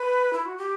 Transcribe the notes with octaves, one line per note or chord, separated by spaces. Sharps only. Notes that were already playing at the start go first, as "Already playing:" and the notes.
Already playing: B4
E4
F#4
G4